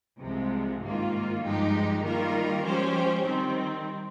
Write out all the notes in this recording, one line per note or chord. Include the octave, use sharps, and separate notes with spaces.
C2 C3 F3 G#3
G#2 D#3 A#3 F4
G2 F3 G#3 D#4 G4
D#3 G3 A#3 F4 A#4
F3 G#3 C#4 G4 C5
D#3 G3 C4